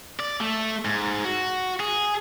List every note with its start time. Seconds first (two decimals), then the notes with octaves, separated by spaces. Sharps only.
0.20 D5
0.41 A3
0.85 G#2
1.24 F#4
1.80 G#4